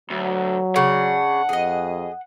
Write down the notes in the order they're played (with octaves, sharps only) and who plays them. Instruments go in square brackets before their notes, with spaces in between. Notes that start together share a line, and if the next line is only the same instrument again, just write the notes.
[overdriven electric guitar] D2 [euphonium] F#3
[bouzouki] C#3 D4 [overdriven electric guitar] F#5
[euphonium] F2 [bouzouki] G#4 D#5